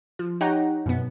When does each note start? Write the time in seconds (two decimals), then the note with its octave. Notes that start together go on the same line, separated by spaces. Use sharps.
0.19 F3
0.41 D#4 G4 C#5 F#5 G5 A#5
0.86 F#2 B2 B3